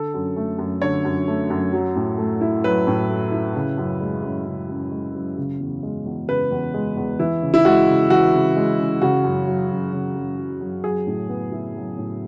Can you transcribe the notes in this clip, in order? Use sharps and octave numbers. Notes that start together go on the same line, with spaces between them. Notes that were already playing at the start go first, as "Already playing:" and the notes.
Already playing: D3 A4
F#2
A3
F#2
D3 C#5
F#2
A3
F#2
F#3
A2
A3
E4
F#3 B4
A2
A3
E4
C#3
F#2
G#3
F#2
C#3
F#2
G#3
F#2
C#3
E2
G#3
E2
C#3 B4
E2
G#3
E2
E3 E4
C#3
E4
G#3 F#4
C#3
E3 F#4
C#3
G#3
C#3
C#3 F#4
F#2
F#3
F#2
C#3
F#2
F#3
F#2
F#3 G#4
A2
B3
E4
F#3
A2